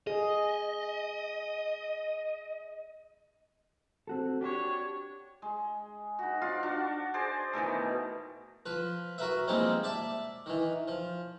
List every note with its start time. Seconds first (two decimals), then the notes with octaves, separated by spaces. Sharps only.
0.07 G#4 D#5
4.07 C4 F#4 A4
4.41 D4 F#4 G4 C#5
5.42 G#3
6.19 D#4 F#4
6.42 F4 F#4 D5 F5
6.63 D4 F#4
7.14 G#4 C5 D5
7.53 B2 D#3 E3 A3
8.66 F3 B4
9.18 F#4 A#4 B4 E5
9.47 F3 G3 G#3 A#3 C4 D#4
9.83 D5 E5 A5
10.46 D#3 E3
10.88 F3